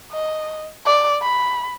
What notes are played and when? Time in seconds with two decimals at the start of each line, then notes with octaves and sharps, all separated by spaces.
0.13 D#5
0.86 D5
1.22 B5